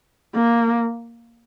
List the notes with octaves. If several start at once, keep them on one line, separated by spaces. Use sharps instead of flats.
A#3